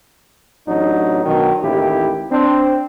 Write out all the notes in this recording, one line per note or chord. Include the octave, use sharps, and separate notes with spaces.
A1 F#3 D4 D#4
B2 D#3 F#3 D4
A1 D#2 E4 G4
C4 D4